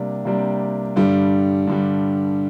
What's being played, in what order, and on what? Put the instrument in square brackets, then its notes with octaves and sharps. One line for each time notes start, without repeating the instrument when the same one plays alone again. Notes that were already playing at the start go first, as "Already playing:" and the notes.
Already playing: [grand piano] C3 G3 A#3 D4
C3 G3 A#3 D4
G2 D3 G3
G2 D3 G3